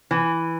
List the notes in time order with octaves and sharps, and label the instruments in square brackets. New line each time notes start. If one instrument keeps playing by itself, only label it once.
[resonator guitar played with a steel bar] E3